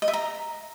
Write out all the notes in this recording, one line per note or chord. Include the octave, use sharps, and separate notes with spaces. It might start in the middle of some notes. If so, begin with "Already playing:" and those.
D#5
E5
A#5